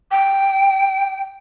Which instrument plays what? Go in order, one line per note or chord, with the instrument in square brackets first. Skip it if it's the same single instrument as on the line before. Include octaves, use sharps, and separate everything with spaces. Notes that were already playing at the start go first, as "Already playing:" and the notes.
[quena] G5